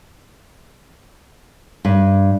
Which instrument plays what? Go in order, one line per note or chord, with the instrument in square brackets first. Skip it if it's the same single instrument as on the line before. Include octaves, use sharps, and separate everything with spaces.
[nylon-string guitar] G2